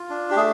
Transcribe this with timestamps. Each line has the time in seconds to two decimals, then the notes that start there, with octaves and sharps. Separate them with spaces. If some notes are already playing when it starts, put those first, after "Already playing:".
Already playing: F4
0.10 D4
0.31 G4
0.36 A3 G#4